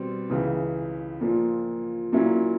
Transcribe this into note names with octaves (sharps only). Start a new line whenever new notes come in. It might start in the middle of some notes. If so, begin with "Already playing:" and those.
Already playing: B2 G3 C4
C#2 C#3 E3
A#2 F3 A#3
A#2 F#3 A#3 C#4 E4